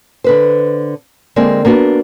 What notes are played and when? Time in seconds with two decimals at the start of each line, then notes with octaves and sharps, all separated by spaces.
0.24 D3 B4 C5
1.36 D3 G#3 A#3 C4
1.65 A#3 B3 D4 F#4